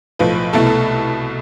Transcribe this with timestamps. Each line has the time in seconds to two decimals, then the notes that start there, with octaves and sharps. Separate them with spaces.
0.19 B1 A2 F3 B4
0.53 C2 B2 A3 E4 A4
0.67 A4